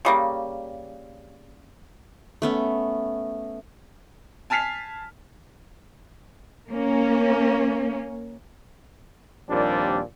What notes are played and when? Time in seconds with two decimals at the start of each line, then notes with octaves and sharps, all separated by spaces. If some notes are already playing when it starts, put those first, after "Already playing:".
0.05 C#3 G3 A#3
2.42 A3 B3 C#4
4.50 G#5 A5 F6 B6 C7 F7
6.69 A#3 C#4
9.49 D#2 A#2 F3 G3 C4 D4